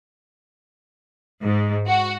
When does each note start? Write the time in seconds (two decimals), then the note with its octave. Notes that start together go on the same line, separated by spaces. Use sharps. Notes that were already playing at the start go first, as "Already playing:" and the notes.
1.42 G#2
1.87 F#4